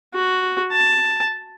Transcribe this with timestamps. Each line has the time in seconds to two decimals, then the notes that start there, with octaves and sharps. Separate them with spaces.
0.15 F#4
0.72 A5